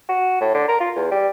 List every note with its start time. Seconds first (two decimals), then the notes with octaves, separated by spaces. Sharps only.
0.09 F#4
0.41 A2
0.54 D3
0.68 A#4
0.80 F4
0.96 E2
1.11 G3